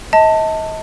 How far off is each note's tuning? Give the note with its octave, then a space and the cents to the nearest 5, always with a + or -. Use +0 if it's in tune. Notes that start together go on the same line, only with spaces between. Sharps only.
D#5 +35 A5 +20